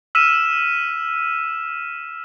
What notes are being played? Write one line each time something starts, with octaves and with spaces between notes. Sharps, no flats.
E6 F6 B6 D#7 E7